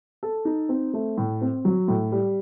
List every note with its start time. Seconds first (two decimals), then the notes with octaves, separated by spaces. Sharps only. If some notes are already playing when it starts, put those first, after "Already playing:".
0.23 A4
0.45 D#4
0.69 C4
0.94 A3
1.18 A2
1.41 C4
1.65 F#3
1.88 A2
2.12 G3